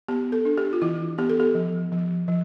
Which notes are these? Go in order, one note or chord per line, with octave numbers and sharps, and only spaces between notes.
B3 G4
A4
D4
G4
F4
E3 E4
B3 G4
A4
G4
F3
F3
F3